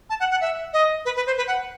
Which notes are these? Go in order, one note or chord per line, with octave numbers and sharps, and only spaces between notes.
A5
F#5
F#5
E5
D#5
B4
B4
C5
B4
F#5